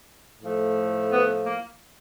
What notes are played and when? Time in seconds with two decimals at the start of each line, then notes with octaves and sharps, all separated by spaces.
0.42 A2 F3 A3
1.11 B3
1.45 A#3